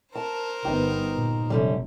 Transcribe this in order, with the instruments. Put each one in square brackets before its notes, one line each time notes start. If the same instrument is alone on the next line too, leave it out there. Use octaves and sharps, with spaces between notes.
[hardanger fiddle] A#4 C5 [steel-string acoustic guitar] A5
[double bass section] G1 B3 [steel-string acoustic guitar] D#4 G4
[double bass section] A#2
[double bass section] F1 [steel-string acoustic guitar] F#2 D3 G3